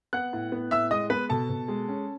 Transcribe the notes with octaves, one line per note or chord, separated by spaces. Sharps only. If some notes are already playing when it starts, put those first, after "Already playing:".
B3 F#5 F#6
A2
B3
A2 E5 E6
G#3 D#5 D#6
B3 B4 B5
B2 A4 A5
B2
G#3
C#4